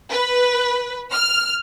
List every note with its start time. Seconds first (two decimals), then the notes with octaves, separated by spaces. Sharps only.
0.10 B4
1.12 F6